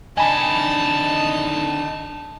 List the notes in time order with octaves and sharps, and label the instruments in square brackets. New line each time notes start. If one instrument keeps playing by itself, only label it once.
[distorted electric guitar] D3 D#3 [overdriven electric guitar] D4 D#5 [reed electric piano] G#5 B5 [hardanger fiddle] A5